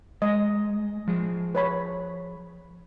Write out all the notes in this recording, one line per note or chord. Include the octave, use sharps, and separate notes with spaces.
G#3 D#5
F3 G#4
B4 C#5 B5